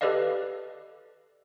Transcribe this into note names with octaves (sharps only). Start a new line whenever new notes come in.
G4 A4 B4 D5 D#5 F5